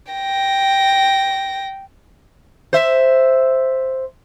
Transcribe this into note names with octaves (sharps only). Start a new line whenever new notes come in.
G5 A#6
C5 E5